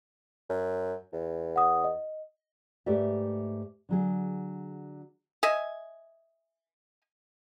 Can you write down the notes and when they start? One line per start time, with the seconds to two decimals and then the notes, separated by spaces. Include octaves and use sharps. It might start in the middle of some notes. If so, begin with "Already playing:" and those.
0.49 F#2
1.13 E2
1.56 F#5 D#6
1.84 D#5
2.86 G#2 A3 G4 B4 D5 E5
3.89 D3 F#3 G#4
5.43 D#5 E5 G#5